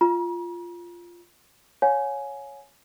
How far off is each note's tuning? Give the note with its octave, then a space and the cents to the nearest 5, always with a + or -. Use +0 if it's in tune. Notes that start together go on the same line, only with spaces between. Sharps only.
F4 -5 A#5 +40
C#5 +0 F5 +35 G#5 +15